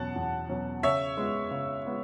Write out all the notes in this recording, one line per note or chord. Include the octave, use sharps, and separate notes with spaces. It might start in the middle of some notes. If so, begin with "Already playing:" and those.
Already playing: E2 B2 F#3 C#4 F#5 A5
E2
B2 F#3 C#4
C#3 C#5 E5
G#3 B3
C#3
G#3 B3